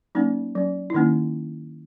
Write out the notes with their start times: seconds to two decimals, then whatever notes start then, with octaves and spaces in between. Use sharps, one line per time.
0.15 F#3 A#3 C#4 D#4
0.55 F#3 C#4
0.90 E4
0.94 D#3 A#3 C#4 D#4